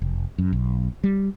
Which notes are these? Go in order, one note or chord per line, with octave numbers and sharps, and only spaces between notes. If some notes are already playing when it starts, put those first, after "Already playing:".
F1
F#2
B1
G3